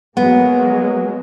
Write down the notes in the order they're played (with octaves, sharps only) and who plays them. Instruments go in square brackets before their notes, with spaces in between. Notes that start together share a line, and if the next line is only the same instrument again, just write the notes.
[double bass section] F#3 G#3 A#3 [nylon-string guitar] B3